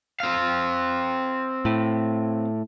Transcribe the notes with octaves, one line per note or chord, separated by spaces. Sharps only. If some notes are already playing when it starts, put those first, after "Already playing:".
C4 F5
A2